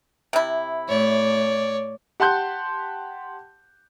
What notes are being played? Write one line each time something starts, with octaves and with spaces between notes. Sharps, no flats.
C3 E4
A2 C#5 D5
G4 F#5 A5 C6 F#6 G6